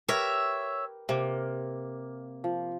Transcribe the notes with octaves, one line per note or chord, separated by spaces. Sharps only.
G4 A#4 B4 C#5 E5
C3 A#3
F3